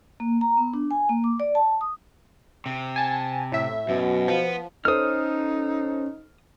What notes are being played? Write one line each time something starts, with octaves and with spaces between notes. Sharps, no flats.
A#3
A#5
B3
D4
G#5
A#3
D6
D5
A5
D#6
C3
G#5 A5
A2 E5
F#2 B2
F3 B3
C#4 D#4 A4 C5 D#6 F6